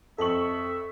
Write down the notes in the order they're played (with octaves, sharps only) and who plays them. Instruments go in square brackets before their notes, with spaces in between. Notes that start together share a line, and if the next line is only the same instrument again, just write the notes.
[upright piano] F2 F#7 [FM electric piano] A4 C#6 [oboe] E5